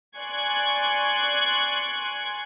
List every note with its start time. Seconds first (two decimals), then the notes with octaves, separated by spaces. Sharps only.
0.17 D5 G#5 C6 C#6 F#6 G#6